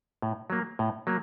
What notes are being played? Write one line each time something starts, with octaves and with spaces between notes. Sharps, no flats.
A2
F#3 A#3
A2
F#3 A#3